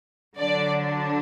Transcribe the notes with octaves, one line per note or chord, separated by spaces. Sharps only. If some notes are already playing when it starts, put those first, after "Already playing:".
D3 F#3 D4 D5